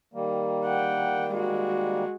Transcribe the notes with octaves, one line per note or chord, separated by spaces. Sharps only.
D#3 G3 A#3
F#5 G5
G#3 F#4